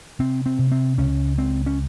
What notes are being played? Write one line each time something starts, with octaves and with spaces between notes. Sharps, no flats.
C3 C4
C4
C3
C4
C#2 C#4
C#2 C4
C#4